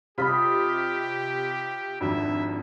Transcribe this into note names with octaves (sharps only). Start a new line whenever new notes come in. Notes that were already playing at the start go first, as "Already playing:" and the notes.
C3 F4 G4 D#5 B5 B6
G#1 F2 D4 F#4 E5